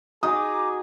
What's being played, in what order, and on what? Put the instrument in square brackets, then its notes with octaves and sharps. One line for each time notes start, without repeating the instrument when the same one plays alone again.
[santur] D#4 F#4 D#5 [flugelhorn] G#4 [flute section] A#5 D6 [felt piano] D#6